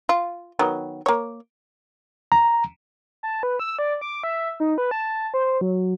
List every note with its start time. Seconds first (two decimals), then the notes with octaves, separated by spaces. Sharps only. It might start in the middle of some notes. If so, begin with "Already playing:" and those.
0.09 F4
0.59 D#3 F#3 B3
1.06 A#3 C#5
2.32 A#5
3.23 A5
3.43 B4
3.59 E6
3.79 D5
4.01 D6
4.23 E5
4.60 D#4
4.78 B4
4.91 A5
5.34 C5
5.61 F#3